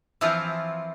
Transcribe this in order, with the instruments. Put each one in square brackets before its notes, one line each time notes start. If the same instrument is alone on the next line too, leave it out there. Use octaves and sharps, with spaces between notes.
[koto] E3 F3 C4 E4 F4